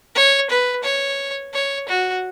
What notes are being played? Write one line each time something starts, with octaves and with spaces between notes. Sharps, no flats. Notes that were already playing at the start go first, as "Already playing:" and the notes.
C#5
B4
C#5
C#5
F#4